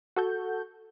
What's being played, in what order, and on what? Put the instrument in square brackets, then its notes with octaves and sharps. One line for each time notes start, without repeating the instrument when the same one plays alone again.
[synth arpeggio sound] F#4 A4 G6